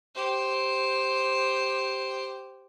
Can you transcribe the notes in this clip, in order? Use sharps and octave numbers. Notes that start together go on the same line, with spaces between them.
G4 C5